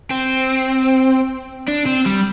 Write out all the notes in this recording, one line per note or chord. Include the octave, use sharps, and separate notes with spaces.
C4
D4
C4
G3